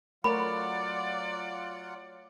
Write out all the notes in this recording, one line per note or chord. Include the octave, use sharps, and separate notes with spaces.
F#3 A3 F4 A#4 C#5 D5 F#5 B5